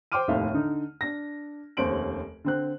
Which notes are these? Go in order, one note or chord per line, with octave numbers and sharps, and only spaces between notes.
C5 G5 C6 D6 F6 D#7
F1 D#2 A2 D#4 E5 F5
D3 D#4
D4 A#6
F1 D#2 C#4 C5 D7 F#7
D3 C4 F#6